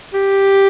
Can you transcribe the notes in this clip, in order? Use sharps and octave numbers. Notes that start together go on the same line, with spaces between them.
G4